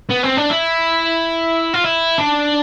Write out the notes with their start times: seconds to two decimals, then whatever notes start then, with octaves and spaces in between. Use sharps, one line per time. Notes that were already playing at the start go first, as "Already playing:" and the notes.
0.09 B3
0.23 C4
0.37 D4
0.50 E4
1.74 F4
1.84 E4
2.18 D4